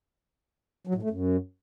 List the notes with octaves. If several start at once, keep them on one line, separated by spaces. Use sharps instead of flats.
F#3
A2
A3
F#2